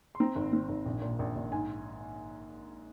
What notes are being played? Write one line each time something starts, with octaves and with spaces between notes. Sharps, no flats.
C6
C4 A#5
G#1
C4
G#1
A#1
A#2
A#1
A#1
G#2 G#5